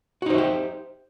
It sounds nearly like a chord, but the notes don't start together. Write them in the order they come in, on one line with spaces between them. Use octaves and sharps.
F#4 D#4 C5 E5 G4